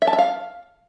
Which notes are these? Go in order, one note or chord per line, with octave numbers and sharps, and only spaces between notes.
E5
A5
E5
F5